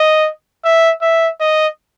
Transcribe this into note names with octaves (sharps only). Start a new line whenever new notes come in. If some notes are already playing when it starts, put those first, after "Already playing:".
Already playing: D#5
E5
E5
D#5